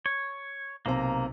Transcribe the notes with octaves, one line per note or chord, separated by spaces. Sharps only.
C#5
B1 C3 A#3 A#5